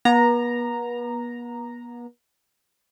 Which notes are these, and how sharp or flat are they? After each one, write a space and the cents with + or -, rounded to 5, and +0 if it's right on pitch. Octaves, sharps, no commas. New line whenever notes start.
B3 -40 A#5 +0